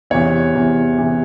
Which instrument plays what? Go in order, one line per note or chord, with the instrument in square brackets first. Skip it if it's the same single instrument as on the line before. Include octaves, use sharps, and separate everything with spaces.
[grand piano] E2 C3 E3 C#5
E2 C3 E3
C3 E3